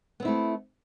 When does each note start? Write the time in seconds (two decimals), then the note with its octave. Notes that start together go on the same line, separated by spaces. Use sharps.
0.20 B3
0.22 C4
0.25 E4
0.28 A3